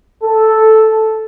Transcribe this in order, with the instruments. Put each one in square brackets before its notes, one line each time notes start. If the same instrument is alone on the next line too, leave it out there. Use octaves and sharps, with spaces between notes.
[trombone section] A4